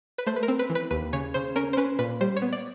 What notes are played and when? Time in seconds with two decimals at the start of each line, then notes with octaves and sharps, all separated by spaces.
0.18 B4
0.26 A3 C5
0.36 B4
0.43 A#4
0.48 C4
0.59 B4
0.70 E3
0.75 B4
0.91 D#2 B4
1.13 C#3 C#5
1.34 C#3 C5
1.56 C#4 A#4
1.73 C5
1.77 C#4 B4
1.99 A#2 B4
2.21 G3 C5
2.37 C#5
2.42 B3
2.53 D5